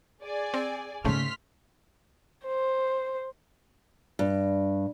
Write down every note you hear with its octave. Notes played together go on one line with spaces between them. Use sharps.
G#4 D5 G#5
C4
G#2 C#3 A3 A#3 C#4 C6 F6 B6
C5
G2